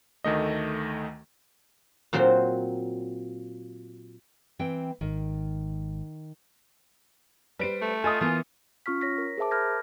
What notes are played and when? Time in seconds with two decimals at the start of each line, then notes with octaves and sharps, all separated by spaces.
0.24 D2 D#3 A3 D#5
2.13 A#2 F#3 C4 F#4 C5
4.59 E3 C4 G5
5.01 G#1 D#3
7.59 G3 B4 C5 D7
7.82 A3
8.04 F4 A4 D#5 G#5 D#6
8.21 E3 B3 F4 A#4
8.86 C#4 F4 C#6 F6 B6
9.01 C#5 A#6 B6
9.18 A#4
9.37 G#4 A#4 C5 E5 A5 D6
9.51 A#4 B5 F6 G6 G#6 A#6